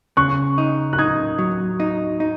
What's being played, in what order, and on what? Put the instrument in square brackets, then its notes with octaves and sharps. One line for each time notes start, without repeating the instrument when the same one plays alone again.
[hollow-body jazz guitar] C#3 [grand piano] C#6 F#6
[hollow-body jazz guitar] D#4
[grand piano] F#6
[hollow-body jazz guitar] D#4 [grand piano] D#6 G#6
[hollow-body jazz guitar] F#3
D#4
D#4